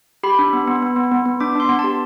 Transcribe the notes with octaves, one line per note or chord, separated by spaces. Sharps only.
G4 B5
D4
B3
B3
B3
B3
B3
B3
D4 D6
D4 C6
B3
A5
G4